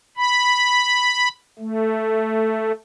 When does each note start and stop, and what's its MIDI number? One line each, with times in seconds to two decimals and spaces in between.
0.17 1.28 83
1.59 2.72 57